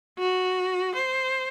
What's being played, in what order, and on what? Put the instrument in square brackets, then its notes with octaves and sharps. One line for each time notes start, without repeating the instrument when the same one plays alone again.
[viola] F#4
C5